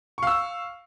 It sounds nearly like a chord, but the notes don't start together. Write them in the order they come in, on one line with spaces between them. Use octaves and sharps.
C#6 F5 E6